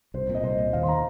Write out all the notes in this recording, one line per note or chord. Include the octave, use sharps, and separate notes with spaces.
C2 C5
A#2
D#5
C2 C5
A#2
D#2 F5
C6
A#5